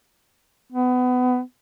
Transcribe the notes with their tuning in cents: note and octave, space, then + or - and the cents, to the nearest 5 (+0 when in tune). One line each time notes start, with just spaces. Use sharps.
B3 +25